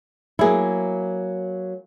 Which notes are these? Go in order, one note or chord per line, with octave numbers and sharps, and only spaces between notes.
F#3 A#3 E4 G#4